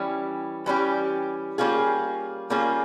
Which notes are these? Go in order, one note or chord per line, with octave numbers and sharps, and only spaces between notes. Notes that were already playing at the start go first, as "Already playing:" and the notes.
Already playing: E3 G3 C#4 G4
E3 G3 C#4 G4
G3 A#3 C#4 F4 G#4
G3 A#3 C#4 F4 G#4